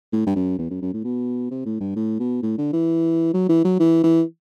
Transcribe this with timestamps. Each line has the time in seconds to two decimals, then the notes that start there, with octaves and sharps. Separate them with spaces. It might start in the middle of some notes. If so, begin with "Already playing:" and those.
0.12 A2
0.26 G2
0.35 F#2
0.58 E2
0.70 F#2
0.82 F#2
0.93 A2
1.04 B2
1.51 C3
1.66 A2
1.80 G2
1.96 A2
2.19 B2
2.43 A2
2.58 D3
2.73 E3
3.33 F#3
3.49 E3
3.64 F#3
3.79 E3
4.03 E3